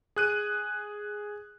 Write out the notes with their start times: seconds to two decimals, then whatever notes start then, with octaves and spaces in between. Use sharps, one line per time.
0.16 G#4 F#6 D#7